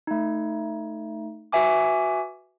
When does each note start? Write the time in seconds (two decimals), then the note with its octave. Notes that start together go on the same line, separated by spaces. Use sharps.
0.07 A3 D#4
1.52 F#4 B4 E5 G#5 D6